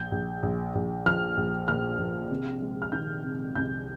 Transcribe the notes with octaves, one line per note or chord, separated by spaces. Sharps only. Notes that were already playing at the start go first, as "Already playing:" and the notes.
Already playing: A#1 G6
A#1
A#1
A#1
F3 F6
A#1
A#2 F6
A#1
C3
G#3
F6
D#3 G6
C3
C2 G6